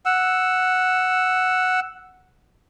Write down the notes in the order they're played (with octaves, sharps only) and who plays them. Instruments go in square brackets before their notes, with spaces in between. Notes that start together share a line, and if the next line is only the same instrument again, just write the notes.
[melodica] F#5 E6